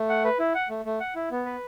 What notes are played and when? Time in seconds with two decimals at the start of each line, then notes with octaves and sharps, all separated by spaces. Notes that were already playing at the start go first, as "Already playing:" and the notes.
Already playing: A3
0.09 F#5
0.25 B4
0.39 E4
0.55 F#5
0.69 A3
0.85 A3
1.00 F#5
1.15 E4
1.31 B3
1.45 B4